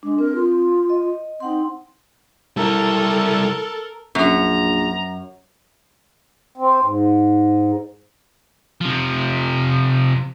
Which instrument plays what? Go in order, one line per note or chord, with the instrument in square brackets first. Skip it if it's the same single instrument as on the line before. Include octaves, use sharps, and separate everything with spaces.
[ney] G#3 [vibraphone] D4
[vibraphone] C4 [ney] A#4
[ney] F4
[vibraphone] D#5
[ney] C4 [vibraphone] D#4 F#5 C6
[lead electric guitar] G3 E4 [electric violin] A4 [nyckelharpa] A#4
[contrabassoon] A#1 [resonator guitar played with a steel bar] F#2 [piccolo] A#5
[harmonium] C4
G#2
[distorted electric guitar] C3 F3